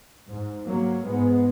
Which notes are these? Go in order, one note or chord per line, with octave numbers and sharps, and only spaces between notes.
G#2
F#3 A#3
G#2 G#3 B3